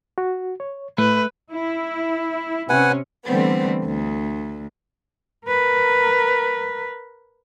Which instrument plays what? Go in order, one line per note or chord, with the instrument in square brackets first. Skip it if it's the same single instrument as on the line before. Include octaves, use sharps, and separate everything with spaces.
[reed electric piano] F#4
C#5
[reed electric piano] A2 [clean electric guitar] A3 [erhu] B4
[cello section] E4
[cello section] C3 C#4 [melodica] B4 F#5 G#5
[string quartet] D3 E3 G3 A3 B3 C4
D2
[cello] A#4 B4